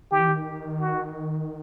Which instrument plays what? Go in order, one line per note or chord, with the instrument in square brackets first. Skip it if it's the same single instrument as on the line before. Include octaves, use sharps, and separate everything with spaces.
[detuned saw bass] D#3 [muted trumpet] G4
[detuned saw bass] E3
D#3
[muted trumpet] F#4